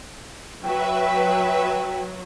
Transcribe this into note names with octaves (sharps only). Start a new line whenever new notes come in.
F#3 B4 E5 G5